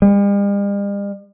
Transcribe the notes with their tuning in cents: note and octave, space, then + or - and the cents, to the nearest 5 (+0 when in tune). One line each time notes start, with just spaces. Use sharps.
G3 +45